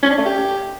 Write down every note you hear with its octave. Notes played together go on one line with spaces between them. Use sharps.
C#4
D4
A3
G4